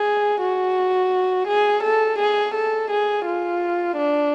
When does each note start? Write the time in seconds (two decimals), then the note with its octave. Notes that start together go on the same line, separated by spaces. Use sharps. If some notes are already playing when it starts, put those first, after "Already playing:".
Already playing: G#4
0.40 F#4
1.47 G#4
1.83 A4
2.19 G#4
2.54 A4
2.91 G#4
3.26 F4
3.97 D4